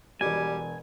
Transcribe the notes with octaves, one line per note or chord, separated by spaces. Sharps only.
E1 B2 G3 G#5